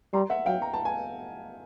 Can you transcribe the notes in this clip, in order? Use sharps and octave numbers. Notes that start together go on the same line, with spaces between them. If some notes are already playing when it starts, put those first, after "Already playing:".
G3 A#5 C6
E5 F#5
F#3 F5 G5
A#5
A5
G#5